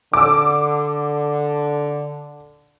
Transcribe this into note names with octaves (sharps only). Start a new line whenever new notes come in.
D3 D6 E6